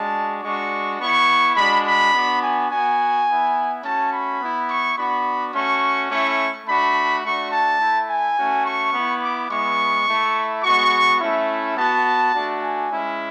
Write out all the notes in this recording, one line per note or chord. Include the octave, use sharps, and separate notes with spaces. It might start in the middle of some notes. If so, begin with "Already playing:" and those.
Already playing: G#3 D4 F#4 A5
G#3 D4 F#4 C#6
B3 E4 C#6
G#3 D4 F#4 B5
B5
B3 D4 F#4
G#5
F#4 G#5
B3
B3 E4
A3 C#4 F#4 A5
B5
B3 E4
C#6
B3 D4 F#4 B5
A3 C#4 F#4 C#6
A3 C#4 E4 C#6
A3 D4 F#4 B5
A3 D4 F#4 C#6
A5
A3 E4
G#5
A3 C#4 F#4
C#6
B3 E4
D6
G#3 B3 E4 C#6
A3 E4
G#3 B3 F#4 C#6
A3 C#4 E4
B3 F#4 A5
A3 D4 F#4
G#5
G#3 C#4 E4